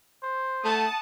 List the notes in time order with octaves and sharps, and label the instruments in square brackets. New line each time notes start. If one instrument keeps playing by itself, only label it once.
[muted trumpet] C5
[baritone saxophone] A3 [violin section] F#5 A5 D#6